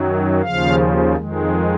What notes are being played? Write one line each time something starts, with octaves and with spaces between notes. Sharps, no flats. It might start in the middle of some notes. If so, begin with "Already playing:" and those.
Already playing: F#2 D#3 F#3
D#2 C#3 F3 F5
F2 D#3 G#3